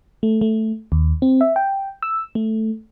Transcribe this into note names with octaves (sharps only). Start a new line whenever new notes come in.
A3
A3
D#2
C4
E5
G5
E6
A3